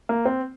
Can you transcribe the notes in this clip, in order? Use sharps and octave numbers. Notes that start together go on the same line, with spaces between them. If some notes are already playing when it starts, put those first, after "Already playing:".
A#3
C4